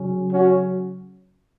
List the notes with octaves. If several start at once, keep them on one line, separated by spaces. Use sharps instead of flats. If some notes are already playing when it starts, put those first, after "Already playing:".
Already playing: C#3 F#3 C#4
C#4 F#4